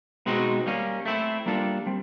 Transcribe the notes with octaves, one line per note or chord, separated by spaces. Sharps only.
B2 G#3 C4 D#4 F#4
G3 A#3 C#4
A3 C4 E4
G3 A#3 D4 F4 A4
G3 C4